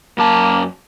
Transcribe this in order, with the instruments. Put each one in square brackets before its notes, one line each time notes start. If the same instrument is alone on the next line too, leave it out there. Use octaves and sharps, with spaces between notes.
[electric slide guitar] F#2 A5 [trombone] A#3